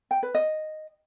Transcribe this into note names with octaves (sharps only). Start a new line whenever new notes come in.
G5
B4
D#5